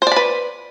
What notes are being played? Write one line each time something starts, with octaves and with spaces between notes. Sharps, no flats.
B4 C5 D5 B5